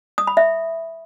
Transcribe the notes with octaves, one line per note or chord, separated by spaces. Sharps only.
D#6
B5
E5